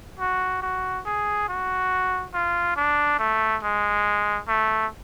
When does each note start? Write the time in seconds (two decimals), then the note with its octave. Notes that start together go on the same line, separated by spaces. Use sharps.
0.20 F#4
0.63 F#4
1.06 G#4
1.49 F#4
2.34 F4
2.76 D4
3.19 A3
3.63 G#3
4.48 A3